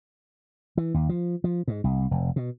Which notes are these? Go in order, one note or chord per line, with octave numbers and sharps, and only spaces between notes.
E3
D#2
F3
F3
G#2
C2
F1
B2